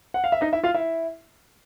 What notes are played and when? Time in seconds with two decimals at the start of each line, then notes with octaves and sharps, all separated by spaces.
0.14 F#5
0.24 F5
0.32 E5
0.41 D#4 D#5
0.53 E4 E5
0.64 F4 F5
0.74 E4 E5